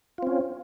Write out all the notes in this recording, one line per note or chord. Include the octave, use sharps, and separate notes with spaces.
C4 C#4 F4